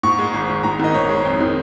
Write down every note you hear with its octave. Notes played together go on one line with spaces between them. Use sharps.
G#2 C#6
G#3
G#1
G#1
G#2 A#5
D#3 D#5
G#1 C#5
G#3
F2
D#3